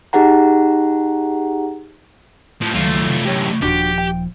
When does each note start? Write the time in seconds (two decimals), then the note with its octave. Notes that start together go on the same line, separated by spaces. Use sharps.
0.13 D#4 G4 G#4 F#5 A#5
2.61 A2 F3
2.74 C#2 D#3 F3 F#3 A3 F4
3.02 C3 E3
3.25 F#2 A2 G4 C#5
3.62 D#1 F3 D4 F#4 G4
3.98 G5